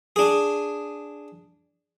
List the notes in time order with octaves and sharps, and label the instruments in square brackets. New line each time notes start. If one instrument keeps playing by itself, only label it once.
[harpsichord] D4 G#4